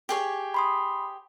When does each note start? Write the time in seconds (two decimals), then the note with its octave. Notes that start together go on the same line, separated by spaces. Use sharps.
0.09 G4 G#4 C#5
0.54 B5 C6 D#6